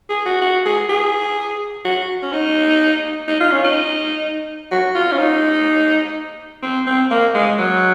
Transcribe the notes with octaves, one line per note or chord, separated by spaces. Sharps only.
G#4
F#4
F#4
G#4
G#4
F#4
C#4
D#4
D#4
F4
C#4
D#4
F#4
F4
C#4
D#4
C4
C4
A#3
G#3
F#3